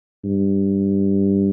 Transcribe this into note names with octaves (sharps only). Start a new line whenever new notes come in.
G2